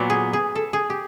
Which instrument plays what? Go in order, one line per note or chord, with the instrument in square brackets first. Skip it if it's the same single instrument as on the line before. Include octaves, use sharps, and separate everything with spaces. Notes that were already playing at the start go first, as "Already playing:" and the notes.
Already playing: [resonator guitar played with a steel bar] A#2 F#3 B3
[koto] G#4
G#4
A4
G#4
G4